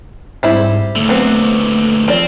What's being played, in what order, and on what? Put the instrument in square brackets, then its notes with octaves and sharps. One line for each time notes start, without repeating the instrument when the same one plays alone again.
[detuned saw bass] G#2 [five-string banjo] G3 C4 E4
[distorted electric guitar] D#2 D3 [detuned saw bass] A3
[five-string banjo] F#3 B3 C4
[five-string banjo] F3 D5 [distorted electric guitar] C4